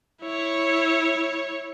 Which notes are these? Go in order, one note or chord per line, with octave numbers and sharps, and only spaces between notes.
E4 C#5